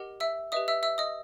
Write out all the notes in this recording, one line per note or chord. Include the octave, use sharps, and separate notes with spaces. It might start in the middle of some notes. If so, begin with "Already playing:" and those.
Already playing: G4 A#4 D#5 F#5
E5 E6
G4 B4 D#5 E5 D#6
E5 E6
E5 E6
D#5 D#6